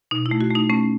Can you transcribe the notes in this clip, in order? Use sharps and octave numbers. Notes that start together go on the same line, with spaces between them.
B2 D#4
E4
A3
F#4
A3 D#4
A3 C#4